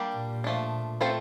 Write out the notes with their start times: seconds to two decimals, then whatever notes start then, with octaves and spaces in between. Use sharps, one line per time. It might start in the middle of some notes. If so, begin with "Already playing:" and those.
Already playing: G3 A#3 D4 G4
0.16 A#2
0.44 F3 A3 D4
1.01 A3 C4 F4 A4 C5